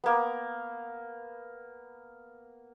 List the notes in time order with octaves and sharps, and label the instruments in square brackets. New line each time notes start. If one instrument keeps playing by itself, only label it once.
[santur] A#3 B3